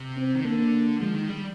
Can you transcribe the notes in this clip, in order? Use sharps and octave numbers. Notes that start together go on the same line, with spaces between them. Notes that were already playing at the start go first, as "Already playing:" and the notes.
Already playing: C3
C4
D#3
D3 A#3
F3 G#3
D#3
G3